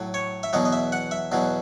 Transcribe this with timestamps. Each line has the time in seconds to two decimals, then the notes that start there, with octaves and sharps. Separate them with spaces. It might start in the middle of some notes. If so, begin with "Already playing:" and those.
Already playing: A2 F#3
0.14 C#5
0.43 E5
0.53 E2 B2 F#3 D#5
0.65 D#5
0.72 E5
0.92 F#5
1.11 E5
1.32 E2 B2 F#3